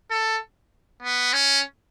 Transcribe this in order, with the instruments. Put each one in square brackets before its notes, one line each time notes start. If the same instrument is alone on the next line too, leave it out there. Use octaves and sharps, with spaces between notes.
[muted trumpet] A4
B3
C#4